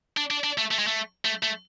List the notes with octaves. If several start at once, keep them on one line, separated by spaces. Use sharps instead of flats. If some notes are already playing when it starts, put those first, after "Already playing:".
D4
D4
D4
A3
A3
G#3
A3
A3
A3